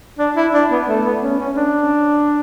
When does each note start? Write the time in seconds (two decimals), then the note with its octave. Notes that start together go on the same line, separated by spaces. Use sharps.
0.19 D4
0.36 E4
0.53 D4
0.71 B3
0.87 A3
1.05 B3
1.22 C#4
1.39 C#4
1.56 D4